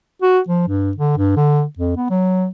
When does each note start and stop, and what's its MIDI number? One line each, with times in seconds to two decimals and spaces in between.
0.22 0.39 66
0.49 0.64 53
0.68 0.91 43
0.97 1.15 50
1.17 1.33 43
1.37 1.64 50
1.79 1.93 41
1.96 2.08 59
2.10 2.47 54